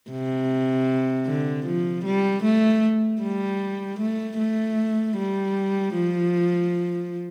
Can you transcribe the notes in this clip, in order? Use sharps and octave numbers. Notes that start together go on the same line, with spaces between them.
C3
D3
F3
G3
A3
G3
A3
A3
G3
F3